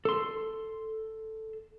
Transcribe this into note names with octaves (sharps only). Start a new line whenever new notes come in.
A4 C6